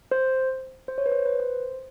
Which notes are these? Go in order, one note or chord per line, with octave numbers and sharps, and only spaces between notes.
C5
C5
C#5
B4
C5
B4
C5